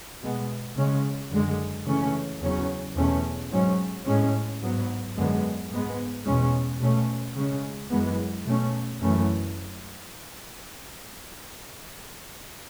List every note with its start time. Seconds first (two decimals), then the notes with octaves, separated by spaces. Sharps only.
0.21 B2 G#3 B3
0.76 C#3 G#3 C#4
1.31 F#2 D3 G#3
1.86 C#3 E3 A3 C#4
2.41 E2 C#3 F#3 C#4
2.96 E2 B2 A3 C#4
3.51 G#2 F#3 C#4
4.06 A2 G#3 C#4
4.61 G#2 F#3 B3
5.17 F#2 D3 G#3 B3
5.71 G#2 G#3 B3
6.26 E2 B2 G#3 C#4
6.81 B2 A3 C#4
7.36 C#3 G#3 C#4
7.90 F#2 E3 G#3 B3
8.46 B2 A3 C#4
9.01 F#2 E3 A3 C#4